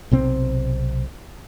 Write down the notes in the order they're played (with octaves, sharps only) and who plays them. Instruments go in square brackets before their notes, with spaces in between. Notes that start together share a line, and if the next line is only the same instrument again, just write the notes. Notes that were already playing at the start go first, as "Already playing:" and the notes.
[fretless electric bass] B1 C3 C4